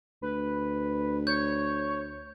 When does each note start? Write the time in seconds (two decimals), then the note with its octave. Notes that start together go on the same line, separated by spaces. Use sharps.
0.22 D2 B4
1.27 C#5 G6